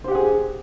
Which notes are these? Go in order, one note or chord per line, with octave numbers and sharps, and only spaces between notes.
G4 G#4 C5 F#5